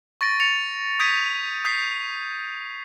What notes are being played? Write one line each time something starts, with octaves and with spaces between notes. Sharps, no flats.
C#6 A6 A#6 D7
A6 C#7 F7
D#6 G6 G#6 B6 D7 D#7
D#6 G6 B6 C7